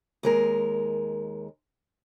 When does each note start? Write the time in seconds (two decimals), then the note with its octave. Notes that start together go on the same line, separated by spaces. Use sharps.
0.23 D#2 G#3 A#4